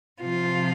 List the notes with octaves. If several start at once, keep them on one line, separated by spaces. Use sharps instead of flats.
C3 F3 F4